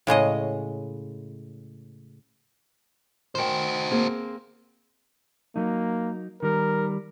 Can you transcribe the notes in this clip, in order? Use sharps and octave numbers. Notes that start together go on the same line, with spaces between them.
A2 C#3 G#3 D#5
D#3 F#4 C5 G5
A#3 C4 G#4
F#3 A#3 D#4
D#3 G3 A#4